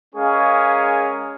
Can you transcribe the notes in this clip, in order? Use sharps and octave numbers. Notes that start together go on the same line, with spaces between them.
G#3 C#4 G#4 A#4 F5 C#6